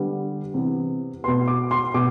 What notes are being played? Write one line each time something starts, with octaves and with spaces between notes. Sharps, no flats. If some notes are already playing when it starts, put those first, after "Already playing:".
Already playing: D3 G3 B3
C3 E3 B3
B2 B3 C6
D6
C6
B2 D6